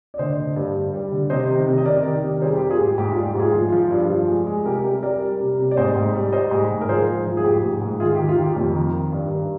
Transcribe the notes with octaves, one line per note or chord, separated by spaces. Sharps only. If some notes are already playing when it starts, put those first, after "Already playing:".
D5
D3 C5 D#5
D3
G2
G2
G3
D3
C3 C5 D#5
D#3
C3
D#5
C3 A#4 D5
D#3
C3
G3 G#4 C5
G4 A#4
G3
F4 G#4
G#2 G4
G#2 G4
F4
G3
G4
G#2 F4 G#4
F3
F3
G2
F3
G#3
G#3
C3 G4 A#4
G3 G4 A#4
G3 A#4 D5
G3
C3
C3
D5
G#2 C5 D#5
G#2
G3
G3 C5 D#5
G#2
G#2
A#4
F3 G#4 C5
G#2
F3
G#4
G#2 G4
G#2
G#2
D#3 F4 G#4
G4
D#3
F4
D#3 G4
F2
D#3
D#3
G2
G2